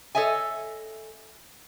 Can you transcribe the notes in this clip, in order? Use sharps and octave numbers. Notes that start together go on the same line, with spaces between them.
A4 C#5 D#5 E5 G#5